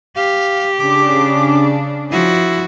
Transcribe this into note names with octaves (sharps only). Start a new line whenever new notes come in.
G4 F5
C#3 D4 D6
F3 E4 F#4